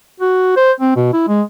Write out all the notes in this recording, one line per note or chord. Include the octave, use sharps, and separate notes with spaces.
F#4
C5
C4
B2
E4
G#3